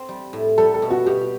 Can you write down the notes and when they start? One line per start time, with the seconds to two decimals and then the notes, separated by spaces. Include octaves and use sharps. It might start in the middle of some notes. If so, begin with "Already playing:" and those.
Already playing: C4
0.09 G3
0.33 A2
0.58 G3 A4
0.74 A4
0.82 B2
0.91 F#4
1.06 B2 G4